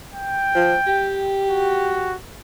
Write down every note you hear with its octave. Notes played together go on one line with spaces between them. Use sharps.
G5
F3
G4
F#4